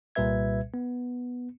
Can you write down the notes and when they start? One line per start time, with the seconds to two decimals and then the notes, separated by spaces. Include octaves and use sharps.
0.15 C2 A#2 G3 B4 E5 G#6
0.74 B3